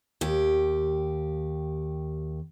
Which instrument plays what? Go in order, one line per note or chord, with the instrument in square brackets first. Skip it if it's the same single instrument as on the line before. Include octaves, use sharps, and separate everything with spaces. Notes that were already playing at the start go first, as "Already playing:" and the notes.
[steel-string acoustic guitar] D#2 G4